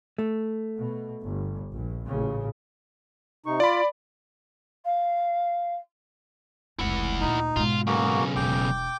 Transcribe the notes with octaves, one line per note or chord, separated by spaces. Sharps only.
A3
B2
G1
A#1
A1 A#2 C#3
C3 D#4 C#6
F4 D5 B5
F5
F1 C#2 E4 F#5
D2 A#2 D#4
G#2 B2 F4
B1 C#3 A#3 F#4
E1 G5 D6